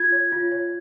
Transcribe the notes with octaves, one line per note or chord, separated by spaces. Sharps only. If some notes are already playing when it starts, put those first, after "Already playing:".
Already playing: F4 G#6
C#5
F4
C#5